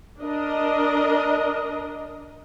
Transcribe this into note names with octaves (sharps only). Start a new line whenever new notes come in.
D4 A#4 D#5